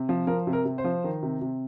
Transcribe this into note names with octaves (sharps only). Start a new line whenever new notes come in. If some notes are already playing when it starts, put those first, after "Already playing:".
Already playing: C3
F3
F3 A#4
C3
A#4
C3
C5
F3
D#3
C3
C3